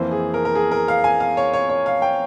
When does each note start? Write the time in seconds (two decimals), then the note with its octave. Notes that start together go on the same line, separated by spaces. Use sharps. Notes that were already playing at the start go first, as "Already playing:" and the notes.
Already playing: F2 E3 A#3 C5
0.11 G#4
0.34 A#4
0.45 A#4
0.55 G#4
0.71 A#4
0.88 F5
1.04 G#5
1.20 F5
1.37 C#5
1.53 C#5
1.69 C#5
1.86 F5
2.02 G5